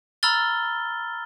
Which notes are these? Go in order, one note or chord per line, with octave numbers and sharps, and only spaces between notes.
A#5 B5 E6 F6 A6 G7